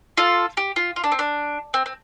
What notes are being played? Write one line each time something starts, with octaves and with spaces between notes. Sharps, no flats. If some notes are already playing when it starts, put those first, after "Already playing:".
F4 A4
G4
F4
F4
D4
C4
D4
C4
C4